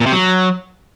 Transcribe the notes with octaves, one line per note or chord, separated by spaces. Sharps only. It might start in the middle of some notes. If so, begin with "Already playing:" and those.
A#2
C3
F#3